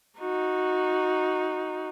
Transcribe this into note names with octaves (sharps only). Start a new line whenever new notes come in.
D#4 F#4